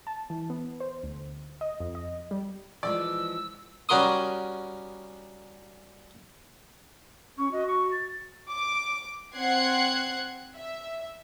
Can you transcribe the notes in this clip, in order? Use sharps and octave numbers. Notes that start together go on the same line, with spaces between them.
A5
E3
B3
C5
D2
D#5
F2
D#5
G3
E3 F3 G#3 D5 E6
G3 C#4 F#4 A#4 C6 D#6
C#4 C#6
F#4 D#5
C#6
A6
D6
C4 F#5 F#6 G#6 C7
E5